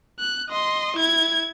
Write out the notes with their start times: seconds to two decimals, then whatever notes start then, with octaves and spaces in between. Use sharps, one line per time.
0.19 F#6
0.50 D#5 C6
0.97 E4 G#6